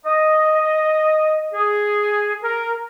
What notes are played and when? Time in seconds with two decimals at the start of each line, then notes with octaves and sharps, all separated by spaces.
0.05 D#5
1.54 G#4
2.43 A#4